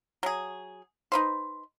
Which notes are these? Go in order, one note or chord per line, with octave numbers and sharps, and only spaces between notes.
F#3 G#4
D#4 B4 C5